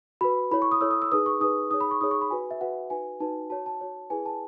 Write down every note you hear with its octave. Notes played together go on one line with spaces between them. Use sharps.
F#4 B4 B5
E4 A4 C#5 B5
C#6
D#6
E4 A4 C#5 E6
D#6
E6
D#4 G#4 B4 D#6
C#6
D#4 G#4 B4 D#6
D#4 G#4 C#5 D#6
B5
C#6
D#4 G#4 C#5 D#6
C#6
B5
F#4 B4 G#5
E5
F#4 B4 F#5
D#4 F#4 B4 G#5
D#4 F#4 B4 A5
F#4 C#5 A5
A5
F#4 C#5
E4 G#4 B4 G#5
A5